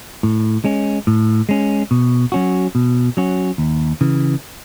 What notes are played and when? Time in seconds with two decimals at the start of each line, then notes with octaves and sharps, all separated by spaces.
0.23 A2
0.65 G#3 C#4
1.07 A2
1.49 G#3 C#4
1.91 B2
2.32 F#3 C#4 F#4
2.75 B2
3.17 F#3 C#4 F#4
3.58 D#2
4.01 C#3 E3